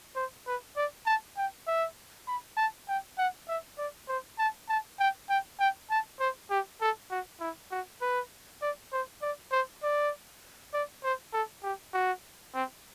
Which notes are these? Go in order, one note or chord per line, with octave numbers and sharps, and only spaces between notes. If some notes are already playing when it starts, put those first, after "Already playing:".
C5
B4
D5
A5
G5
E5
B5
A5
G5
F#5
E5
D5
C5
A5
A5
G5
G5
G5
A5
C5
G4
A4
F#4
E4
F#4
B4
D5
C5
D5
C5
D5
D5
C5
A4
G4
F#4
C4